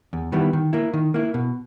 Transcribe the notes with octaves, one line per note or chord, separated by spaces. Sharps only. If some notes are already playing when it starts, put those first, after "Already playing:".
E2
D#3 G3 B3 E4
D#3
A#3 E4
D#3
A#3 E4
B2